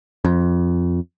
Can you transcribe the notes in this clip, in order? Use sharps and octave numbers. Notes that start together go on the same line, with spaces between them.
F2